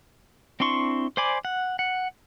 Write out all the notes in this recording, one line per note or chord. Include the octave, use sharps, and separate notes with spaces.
C4 D4 E4 C6 C#6
C5 D5 G#5 B5 D6
F#5
F#5